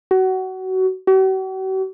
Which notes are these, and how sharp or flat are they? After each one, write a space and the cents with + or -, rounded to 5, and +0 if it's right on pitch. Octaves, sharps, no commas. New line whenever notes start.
F#4 +25
F#4 +45